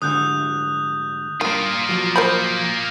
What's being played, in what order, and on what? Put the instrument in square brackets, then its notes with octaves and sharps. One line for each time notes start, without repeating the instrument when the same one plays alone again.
[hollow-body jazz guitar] D2 G#2 D3 [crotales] D#6 F#6 G6
[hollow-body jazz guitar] B1 G2 [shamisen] D#3 [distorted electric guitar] A#3 F4 [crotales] D#7
[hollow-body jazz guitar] F3 F#3
[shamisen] A#4 C5 B5 [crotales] G6